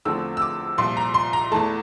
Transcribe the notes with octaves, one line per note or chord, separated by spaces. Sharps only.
E2 D3 F3 A3 C4 E6
E6
D6
C2 A#2 F3 C6
A#5
C6
A#5
E2 E3 A3 A5